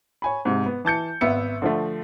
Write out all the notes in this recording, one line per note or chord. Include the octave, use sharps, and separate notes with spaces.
C#5 G#5 B5
G#2 C3
B3
E3 A5 G6 C#7
G#1 B3 E5 C#7
D3 F3 A3